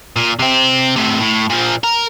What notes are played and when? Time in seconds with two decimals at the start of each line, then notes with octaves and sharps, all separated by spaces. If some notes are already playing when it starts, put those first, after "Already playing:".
0.16 A#2
0.39 C3 C4
0.96 A2 C3
1.20 A2
1.50 A#2 F3
1.84 A#4